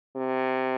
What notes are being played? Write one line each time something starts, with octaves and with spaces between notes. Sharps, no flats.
C3